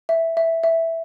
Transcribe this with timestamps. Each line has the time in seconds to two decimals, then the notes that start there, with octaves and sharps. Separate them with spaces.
0.09 E5
0.37 E5
0.64 E5